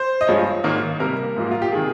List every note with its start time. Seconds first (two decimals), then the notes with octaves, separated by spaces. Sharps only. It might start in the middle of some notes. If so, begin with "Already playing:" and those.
Already playing: C5
0.21 D#5
0.27 G2 F3 G#3 C#5
0.64 G#2 D#3 A#3
1.00 C3 G3 A#3 A#4
1.36 G#2 F3 A#3
1.51 F4
1.62 G4
1.72 C3 D#3 G#4